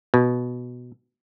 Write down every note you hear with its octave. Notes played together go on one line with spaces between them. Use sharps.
B2